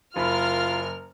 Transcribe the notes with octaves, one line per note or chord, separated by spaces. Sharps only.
F#1 F4 A#4 B5 F6